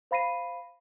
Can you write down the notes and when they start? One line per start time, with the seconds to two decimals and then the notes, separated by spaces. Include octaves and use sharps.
0.11 C5 F5 B5 A#6 C7 D#7